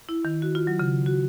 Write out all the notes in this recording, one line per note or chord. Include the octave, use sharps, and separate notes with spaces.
E4
D#3
F#4
F4
F#3
C#3
F#4